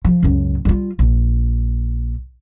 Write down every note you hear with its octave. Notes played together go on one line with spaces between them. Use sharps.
F3
C#2 F#2
G3 F4
A#1